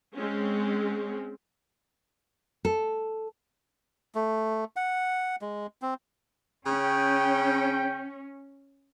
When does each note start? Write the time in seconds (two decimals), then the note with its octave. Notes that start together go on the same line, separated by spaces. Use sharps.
0.14 G#3 C4 C#4
2.65 A4
4.15 A3
4.76 F#5
5.42 G#3
5.82 C4
6.66 C#3 C#4 G5